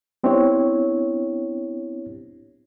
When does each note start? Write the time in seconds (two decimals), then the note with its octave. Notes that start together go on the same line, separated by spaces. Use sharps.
0.24 B3 C4 D4 E4 G4 C#5